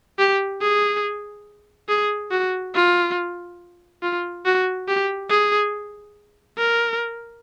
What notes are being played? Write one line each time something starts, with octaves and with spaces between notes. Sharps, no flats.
G4
G#4
G#4
F#4
F4
F4
F#4
G4
G#4
A#4